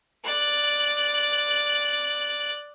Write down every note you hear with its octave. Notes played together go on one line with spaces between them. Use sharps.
D5 F#6